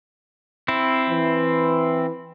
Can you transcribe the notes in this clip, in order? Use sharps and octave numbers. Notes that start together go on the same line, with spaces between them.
C4 E4
E3